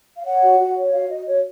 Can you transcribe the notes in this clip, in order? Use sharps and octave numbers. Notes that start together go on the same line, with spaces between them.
F5
C#5 F#5
F#4
F#4
C#5
F#4 F5
F#4 D#5
F#4 C#5